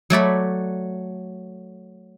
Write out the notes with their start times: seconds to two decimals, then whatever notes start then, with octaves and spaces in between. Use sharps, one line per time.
0.10 F#3 A3 D5 B5